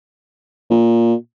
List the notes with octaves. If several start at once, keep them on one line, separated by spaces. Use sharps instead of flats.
A#2